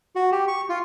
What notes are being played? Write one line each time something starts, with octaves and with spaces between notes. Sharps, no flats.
F#4
G4
C#6
F4